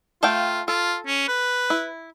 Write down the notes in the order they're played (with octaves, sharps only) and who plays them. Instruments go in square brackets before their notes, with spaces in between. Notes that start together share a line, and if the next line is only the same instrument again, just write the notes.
[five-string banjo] A3 F5 G5 [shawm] F4
[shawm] F4 [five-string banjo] A4
[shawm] C#4
B4
[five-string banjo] E4